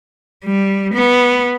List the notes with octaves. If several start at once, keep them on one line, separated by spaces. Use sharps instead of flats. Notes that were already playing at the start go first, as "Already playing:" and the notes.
G3
B3